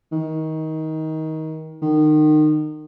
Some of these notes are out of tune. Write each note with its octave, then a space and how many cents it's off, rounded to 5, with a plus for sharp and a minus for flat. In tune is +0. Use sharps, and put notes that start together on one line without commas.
D#3 +20
D#3 -30